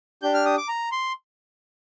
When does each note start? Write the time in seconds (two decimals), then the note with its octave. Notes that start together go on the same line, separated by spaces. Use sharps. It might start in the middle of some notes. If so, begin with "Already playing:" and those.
0.22 D4 G4 G6
0.34 F6
0.46 D#6
0.57 D6
0.68 A#5
0.92 C6